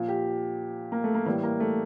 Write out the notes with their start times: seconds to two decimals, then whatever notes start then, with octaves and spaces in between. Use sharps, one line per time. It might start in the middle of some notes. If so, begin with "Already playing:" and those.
Already playing: A#2 F3
0.08 G4
0.92 A#3
1.04 A3
1.14 A#3
1.25 A2 E3 G3 A#3
1.43 A#3
1.60 A3